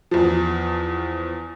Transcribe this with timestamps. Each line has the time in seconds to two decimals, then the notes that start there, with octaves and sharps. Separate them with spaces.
0.11 E2 F3